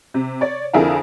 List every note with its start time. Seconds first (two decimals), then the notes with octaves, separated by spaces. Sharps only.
0.14 C3
0.41 C#5 D5
0.73 F2 D3 E4 G#4 A#4 F5